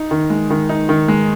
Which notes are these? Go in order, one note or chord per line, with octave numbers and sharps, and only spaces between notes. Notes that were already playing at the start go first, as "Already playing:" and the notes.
Already playing: D#4
D#3
G#3
D#3
D#4
D#3
G#3